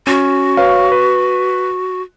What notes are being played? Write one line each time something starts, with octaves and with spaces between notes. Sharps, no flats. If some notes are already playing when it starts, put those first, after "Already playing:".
C#4 F#4
B4 C#5 F5
B4